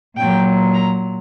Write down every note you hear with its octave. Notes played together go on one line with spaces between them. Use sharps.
A#2 F#3 G5
A#5